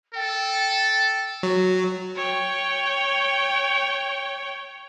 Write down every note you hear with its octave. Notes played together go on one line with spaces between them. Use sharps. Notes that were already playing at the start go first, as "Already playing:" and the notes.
A4 G5
F#3 F#4
C#5 G5